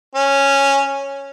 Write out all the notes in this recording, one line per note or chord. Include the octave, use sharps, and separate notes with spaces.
C#4